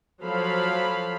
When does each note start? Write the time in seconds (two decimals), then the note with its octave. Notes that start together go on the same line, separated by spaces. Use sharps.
0.24 F3 F#3 A4 F5 B5